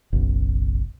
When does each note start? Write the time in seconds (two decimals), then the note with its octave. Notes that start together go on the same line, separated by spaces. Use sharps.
0.13 F#1 B1